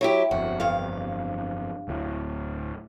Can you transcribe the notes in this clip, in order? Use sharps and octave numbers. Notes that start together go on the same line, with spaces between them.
F#3 E4 G4
G1 F2 F#4
G2 F5
D1 D2 A2